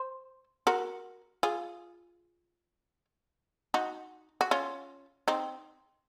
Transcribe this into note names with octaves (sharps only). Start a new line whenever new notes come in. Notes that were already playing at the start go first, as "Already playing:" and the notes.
Already playing: C5
F#4 A#4
F4 G#4
D#4 F#4
F#4
C#4 F4
C4 D#4